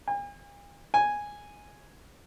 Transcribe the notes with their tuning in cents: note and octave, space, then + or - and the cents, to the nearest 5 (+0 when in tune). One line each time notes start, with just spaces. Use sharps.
G#5 -45
G#5 -5